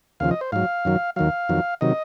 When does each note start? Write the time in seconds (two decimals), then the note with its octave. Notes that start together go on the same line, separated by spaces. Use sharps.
0.20 D#2 C#3 F3 F5
0.31 D#5
0.41 C5
0.52 G#2 F#3 F5
0.85 F#2 D#3 F#3
1.16 D#2 D#3 F#3 F5
1.49 F2 D#3 F#3
1.81 C3 D#3 F#3 D#5